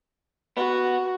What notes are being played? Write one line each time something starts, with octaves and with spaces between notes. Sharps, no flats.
B3 F#4